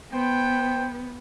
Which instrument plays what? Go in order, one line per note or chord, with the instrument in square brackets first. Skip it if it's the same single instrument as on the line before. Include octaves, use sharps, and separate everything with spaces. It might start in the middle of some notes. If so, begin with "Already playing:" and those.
[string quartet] B3 [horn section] C5 G5